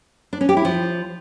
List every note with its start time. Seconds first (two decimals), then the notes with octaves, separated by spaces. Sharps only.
0.33 D4
0.41 C#4
0.49 G4
0.57 E4
0.65 F3